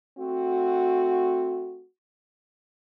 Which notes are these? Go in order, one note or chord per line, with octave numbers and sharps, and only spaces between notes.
A3 C4 F#4